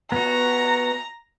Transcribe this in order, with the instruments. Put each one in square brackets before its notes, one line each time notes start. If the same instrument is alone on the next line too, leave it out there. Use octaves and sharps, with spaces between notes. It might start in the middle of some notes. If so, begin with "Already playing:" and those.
[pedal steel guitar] B3 F#4 [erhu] A#5